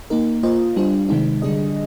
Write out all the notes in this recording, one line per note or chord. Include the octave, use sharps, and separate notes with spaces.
A#3 D#4 A#4
A#3 F4 C5 D#5
G3 D4 F4 C5
C3 D#3 G#3 C4 D#4
D3 G3 D4 G#4 D#5